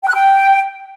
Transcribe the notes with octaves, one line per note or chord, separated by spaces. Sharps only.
G5
F#6
G5